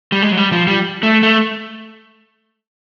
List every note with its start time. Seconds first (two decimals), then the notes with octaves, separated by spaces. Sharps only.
0.12 G3
0.22 G#3
0.32 F#3
0.37 G3
0.52 F3
0.67 G3
1.03 A3
1.23 A3